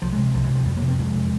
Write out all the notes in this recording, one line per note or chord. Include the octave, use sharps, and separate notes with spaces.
C2 F3
G#3
C3
C2 F3
E3
C3 F3
F2 G3
A#3
C3
C4
F2 G#3
C3